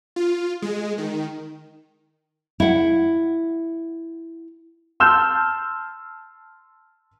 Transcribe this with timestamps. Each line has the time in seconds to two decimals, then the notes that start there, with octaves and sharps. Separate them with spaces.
0.16 F4
0.62 G#3
0.98 D#3
2.60 E4 F#5
5.00 A5 C6 E6 F6 G6 E7